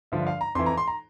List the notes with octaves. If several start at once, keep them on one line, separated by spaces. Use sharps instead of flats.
G2 D3 F3 E5
F5
A#5
F2 E3 C6
A#5
C6
A#5